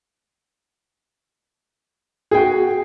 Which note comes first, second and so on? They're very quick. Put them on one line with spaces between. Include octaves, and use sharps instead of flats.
G#4 G5 F#4